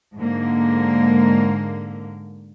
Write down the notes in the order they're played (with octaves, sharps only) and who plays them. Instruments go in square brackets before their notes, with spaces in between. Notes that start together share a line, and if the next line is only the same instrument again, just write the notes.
[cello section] G#2 D3 A#3